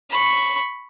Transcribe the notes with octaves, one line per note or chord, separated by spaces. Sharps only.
B5 C#6